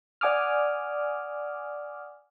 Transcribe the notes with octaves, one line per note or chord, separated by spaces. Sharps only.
D5 F#5 G#5 D6 D#6 F6